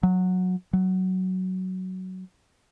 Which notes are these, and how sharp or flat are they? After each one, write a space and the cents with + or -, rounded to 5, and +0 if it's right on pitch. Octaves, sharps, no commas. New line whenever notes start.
F#3 -15
F#3 +10